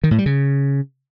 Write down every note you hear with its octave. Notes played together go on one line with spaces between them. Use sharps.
D#3
A2
G3
C#3